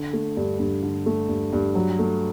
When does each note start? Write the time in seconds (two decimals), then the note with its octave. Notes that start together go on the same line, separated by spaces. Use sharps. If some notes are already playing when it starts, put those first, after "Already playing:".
Already playing: D3
0.13 A3
0.37 G2
0.59 G2
0.83 D3
1.06 A3
1.28 G2
1.53 G2
1.75 F#3
1.99 A3